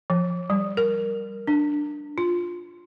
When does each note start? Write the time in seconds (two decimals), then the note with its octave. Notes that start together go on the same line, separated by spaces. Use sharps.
0.10 F3
0.50 G3
0.77 A#4
1.47 D4
2.18 F4